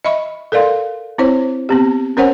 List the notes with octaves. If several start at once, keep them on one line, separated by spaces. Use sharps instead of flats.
D#5 E5 B5 C#6
A4 A#4 D5 F5 C6
C4 E4 C5 C#5
B3 C4 G4
C#4 A#4 C5 C#5 F#5 G#5